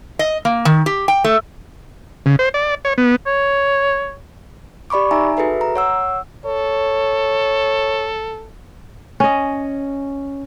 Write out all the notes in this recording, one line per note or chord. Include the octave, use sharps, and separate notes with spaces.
D#5
A#3
D#3
G4
G5
A3
C#3
C5
D5
C#5
B3
C#5
G4 D5 B5 C#6 D6
D#4 E5 G#5 A#5
F#4 G#4 A4 B4 E5
A#5
C#5 F#5 E6
A4 C#5
C#4 D#5